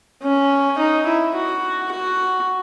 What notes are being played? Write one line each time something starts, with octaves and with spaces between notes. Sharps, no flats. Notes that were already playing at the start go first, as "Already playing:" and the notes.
C#4
D#4
E4
F#4
F#4